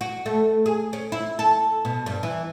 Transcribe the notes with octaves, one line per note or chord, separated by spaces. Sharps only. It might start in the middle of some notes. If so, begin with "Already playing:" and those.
F#4
A3
G#4
C#4
E4
A4
B2
G2
E3